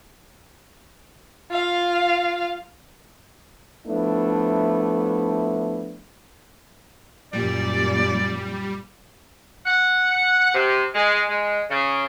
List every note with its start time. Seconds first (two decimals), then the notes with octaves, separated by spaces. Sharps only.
1.51 F4 F5
3.87 F3 A3 B3 D4 E4
7.33 F#2 A#2 G3 D5
9.65 F#5
10.54 C3
10.94 G#3
11.29 G#3
11.70 C#3